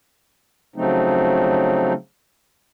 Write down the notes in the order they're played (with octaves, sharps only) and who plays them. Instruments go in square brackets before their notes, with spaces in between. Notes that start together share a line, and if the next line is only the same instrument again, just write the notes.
[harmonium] C#3 F3 F#3 A3 C4 D#4